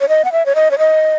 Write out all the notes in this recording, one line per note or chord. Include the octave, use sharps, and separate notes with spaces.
C#5
D#5
F#5
E5
C#5
D#5
C#5
D#5